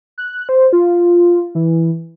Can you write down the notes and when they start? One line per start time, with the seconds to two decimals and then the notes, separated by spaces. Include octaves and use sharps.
0.18 F#6
0.49 C5
0.73 F4
1.55 E3